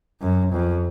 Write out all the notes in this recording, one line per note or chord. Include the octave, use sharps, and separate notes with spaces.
F#2
F2